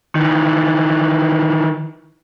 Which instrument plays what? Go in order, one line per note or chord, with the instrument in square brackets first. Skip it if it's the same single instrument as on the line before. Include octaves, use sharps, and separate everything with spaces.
[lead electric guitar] D#3 E3